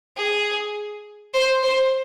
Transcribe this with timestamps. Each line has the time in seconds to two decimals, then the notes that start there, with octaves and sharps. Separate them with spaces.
0.17 G#4
1.34 C5
1.63 C5